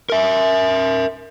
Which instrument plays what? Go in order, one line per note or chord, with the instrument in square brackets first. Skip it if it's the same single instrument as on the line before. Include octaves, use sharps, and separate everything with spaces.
[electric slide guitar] A#4 E5